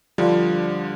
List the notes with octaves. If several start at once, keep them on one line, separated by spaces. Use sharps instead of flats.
D3 F3 G3 D4 F4